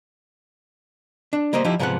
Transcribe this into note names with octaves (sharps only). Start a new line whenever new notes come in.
D4
G3 A#3 C5 D#5
F3 D#4 E4 G4
G#2 C3 F3 B3 C5 F#5